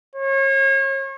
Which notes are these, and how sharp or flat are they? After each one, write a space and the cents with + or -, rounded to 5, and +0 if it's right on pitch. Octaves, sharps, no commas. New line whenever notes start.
C#5 -35